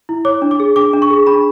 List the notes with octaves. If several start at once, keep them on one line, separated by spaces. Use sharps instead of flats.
E4
C#5 D6
D4
D6
G#4
D4 D6
D4
C#6
G#4
D4 B5